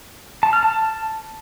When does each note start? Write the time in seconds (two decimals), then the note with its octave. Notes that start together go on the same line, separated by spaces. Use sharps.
0.43 A5
0.53 F6
0.63 A5